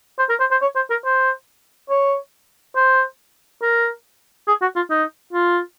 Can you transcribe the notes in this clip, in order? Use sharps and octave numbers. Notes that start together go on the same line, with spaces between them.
C5
A#4
C5
C5
C#5
C5
A#4
C5
C#5
C5
A#4
G#4
F#4
F4
D#4
F4